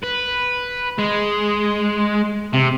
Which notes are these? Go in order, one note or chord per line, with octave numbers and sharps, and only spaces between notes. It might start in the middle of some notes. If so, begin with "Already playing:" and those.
B4
G#3
C3